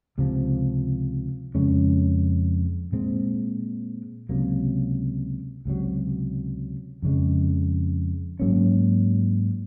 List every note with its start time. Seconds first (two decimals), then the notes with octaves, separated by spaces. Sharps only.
0.18 C#2 C3 F3
1.55 F2 C#3 G#3 C#4
2.92 A#2 G#3 C4
4.29 C#2 C3 F#3 A#3
5.66 C#2 C3 F#3
7.02 F2 C#3 G#3
8.40 G#2 F#3 A#3 C#4